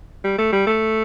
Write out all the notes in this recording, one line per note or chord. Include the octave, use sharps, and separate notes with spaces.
G3
A3
G3
A3